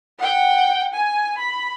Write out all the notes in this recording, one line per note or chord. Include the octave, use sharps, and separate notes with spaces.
F#5 G5
G#5
B5